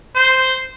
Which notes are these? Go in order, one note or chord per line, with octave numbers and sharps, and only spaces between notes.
C5